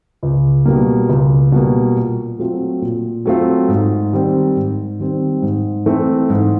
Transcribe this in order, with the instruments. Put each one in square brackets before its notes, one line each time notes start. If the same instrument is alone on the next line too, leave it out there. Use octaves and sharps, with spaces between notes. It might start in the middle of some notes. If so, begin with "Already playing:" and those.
[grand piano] C#2
B2 G3 A#3
C#2
B2 G3 A#3
A#2
F#3 A3 C4 F4
A#2
F#3 A3 C4 F4
G#2
D#3 G3 C4
G#2
D#3 G3 C4
G#2
E3 A3 C4
G#2